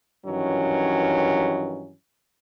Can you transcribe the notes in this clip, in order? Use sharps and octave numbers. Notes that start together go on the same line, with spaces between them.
G2 D#3 E3 F#3 C#4